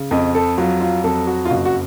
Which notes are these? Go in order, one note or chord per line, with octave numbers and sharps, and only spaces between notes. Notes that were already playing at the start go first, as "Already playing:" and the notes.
Already playing: C#3
F2 D#5
A4
F#3 F4
F4
F2 A4
F#4
F4
F#1 F#4
F#4